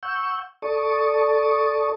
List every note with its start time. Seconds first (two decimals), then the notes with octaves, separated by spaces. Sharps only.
0.03 F#5 C#6 E6 G6
0.62 A4 D5 A5 C#6 D#6